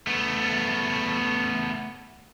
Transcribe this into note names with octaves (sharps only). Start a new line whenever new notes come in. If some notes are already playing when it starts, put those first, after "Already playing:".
A3 B3